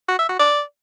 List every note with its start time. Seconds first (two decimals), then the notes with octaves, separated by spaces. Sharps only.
0.08 F#4
0.19 E5
0.29 F#4
0.39 D5